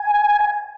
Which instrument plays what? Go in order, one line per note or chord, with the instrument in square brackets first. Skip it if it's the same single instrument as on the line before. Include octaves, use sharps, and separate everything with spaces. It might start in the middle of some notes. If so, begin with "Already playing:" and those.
Already playing: [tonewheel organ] G#5